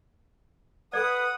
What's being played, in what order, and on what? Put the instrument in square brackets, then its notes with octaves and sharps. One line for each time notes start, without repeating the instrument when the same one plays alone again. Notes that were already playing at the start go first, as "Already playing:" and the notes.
[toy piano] A4 D5 [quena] B4 [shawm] F#5 [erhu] D#6